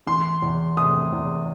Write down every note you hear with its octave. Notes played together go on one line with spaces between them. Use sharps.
E3 C6
E2
C3 D#6
E2